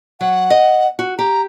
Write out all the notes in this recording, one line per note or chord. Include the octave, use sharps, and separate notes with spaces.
F#3 F#5
D#5
F#4
G4 A#5